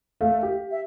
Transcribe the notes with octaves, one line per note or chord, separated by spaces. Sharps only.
A3 F5
G4
E5